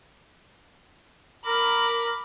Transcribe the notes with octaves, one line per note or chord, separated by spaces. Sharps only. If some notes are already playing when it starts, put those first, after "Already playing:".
A#4 B5 D6